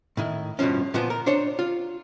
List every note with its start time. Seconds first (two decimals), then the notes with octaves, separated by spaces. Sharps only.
0.17 A2 D#3 E4
0.59 G2 B2 D3 F3 C#4
0.94 A#2 F3 B3
1.10 A#4
1.26 D4 C5 C#5
1.59 F4